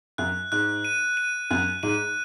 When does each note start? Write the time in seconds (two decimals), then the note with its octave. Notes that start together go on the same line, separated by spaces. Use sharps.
0.18 F#2 F#6
0.52 G#2 F#6
0.85 D#7
1.17 D#7
1.51 F#2 F#6
1.83 G#2 D#7